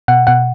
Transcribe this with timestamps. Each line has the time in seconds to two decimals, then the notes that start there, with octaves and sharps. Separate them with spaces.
0.08 B2 F#5
0.27 B2 F#5